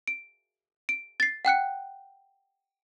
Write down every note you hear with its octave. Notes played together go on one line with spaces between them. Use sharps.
D7
D7
A6 C7
F#5 G5 F#6 C#7